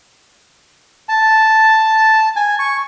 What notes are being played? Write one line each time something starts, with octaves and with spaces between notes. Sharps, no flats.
A5
G#5
C#6